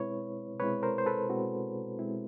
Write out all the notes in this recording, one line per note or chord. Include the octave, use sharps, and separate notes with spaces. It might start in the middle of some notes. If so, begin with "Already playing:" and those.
Already playing: B2 G#3 C4 E4 B4 C#5
B2 G#3 C4 E4 B4 C#5
A#4 C5
C5
A4 B4
B2 G#3 C4 E4 F#4
B2 G#3 C4 E4